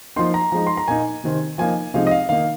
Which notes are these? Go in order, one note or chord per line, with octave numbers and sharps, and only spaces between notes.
F3 A#3 D#4 C6
A#5
F3 G#3 D#4
C6
A#5
A#2 A#3 D#4 G#5
C3 D#3 C4
F3 A#3 D#4 G#5
C3 F3 G#3 D#4 F5
D#5
F5
D#3 A#3 D#4 F5